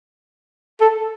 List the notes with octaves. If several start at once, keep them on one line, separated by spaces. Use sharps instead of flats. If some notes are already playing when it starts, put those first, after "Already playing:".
A4